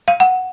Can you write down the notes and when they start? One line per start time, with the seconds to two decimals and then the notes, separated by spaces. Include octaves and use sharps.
0.08 F5
0.20 F#5